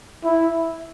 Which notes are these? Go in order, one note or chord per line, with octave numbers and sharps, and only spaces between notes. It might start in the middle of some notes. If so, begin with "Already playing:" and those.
E4